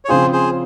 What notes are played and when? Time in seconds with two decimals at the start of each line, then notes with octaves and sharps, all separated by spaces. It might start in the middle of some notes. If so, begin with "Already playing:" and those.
0.05 C#5
0.08 C#3 F3 C4 F4 G#4 C5
0.32 G#4 C5